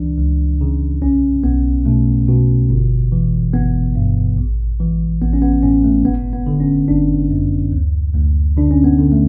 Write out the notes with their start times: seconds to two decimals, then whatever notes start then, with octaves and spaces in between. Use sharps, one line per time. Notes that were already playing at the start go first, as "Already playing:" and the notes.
Already playing: C#2 E3 D4
0.18 C#2
0.61 C#3
1.02 B1 C#4
1.44 B1 B3
1.86 B2 A3
2.29 B2
2.70 G1
3.12 E3
3.53 G1 B3
3.95 G2
4.38 A1
4.80 E3
5.21 A1 B3
5.33 C#4
5.42 B3
5.63 A2 C#4
5.84 A3
6.04 G1 B3
6.33 B3
6.46 D3
6.60 C#4
6.88 G1 D4
7.30 F#2
7.72 D2
8.14 D2
8.57 D3 D4
8.71 C#4
8.84 B3
8.98 D3
9.12 A3